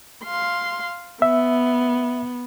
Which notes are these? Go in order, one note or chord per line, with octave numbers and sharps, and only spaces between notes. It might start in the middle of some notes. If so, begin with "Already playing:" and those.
F5 C6
B3 E5